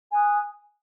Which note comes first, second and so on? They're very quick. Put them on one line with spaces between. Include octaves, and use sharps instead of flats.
G#5 D#6 F#6